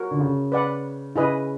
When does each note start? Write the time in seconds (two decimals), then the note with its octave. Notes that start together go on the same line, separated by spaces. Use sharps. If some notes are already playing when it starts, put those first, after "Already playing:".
Already playing: F#4 A#4 C#5
0.11 D3
0.20 C#3
0.52 B4 D5 F#5
1.15 C#3 E4 G#4 B4 D#5